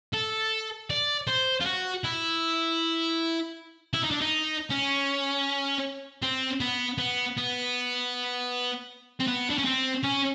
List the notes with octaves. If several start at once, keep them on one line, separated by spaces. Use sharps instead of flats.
A4
D5
C5
F4
F#4
E4
E4
D#4
D4
D#4
C#4
C4
B3
B3
B3
C4
B3
D4
C#4
C4
C#4